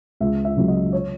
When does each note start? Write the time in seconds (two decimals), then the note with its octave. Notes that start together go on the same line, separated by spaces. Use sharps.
0.20 C#2 E5
0.45 E5
0.57 C#3 F#3 A#3
0.68 D#5
0.92 C#5